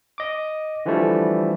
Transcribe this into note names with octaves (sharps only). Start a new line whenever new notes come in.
D#5 D6
D3 E3 F3 G3 A3